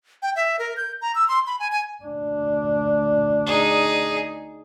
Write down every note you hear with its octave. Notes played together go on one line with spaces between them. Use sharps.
G5
E5
A#4
G6
A#5
E6
C6
B5
G#5
G#5
D2 D4
D#4 G#4